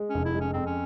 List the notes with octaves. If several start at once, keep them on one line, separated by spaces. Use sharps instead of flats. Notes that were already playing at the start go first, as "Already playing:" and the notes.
Already playing: G#3
F1 C#4
E4
G#3
C#4
F2 C4
C#4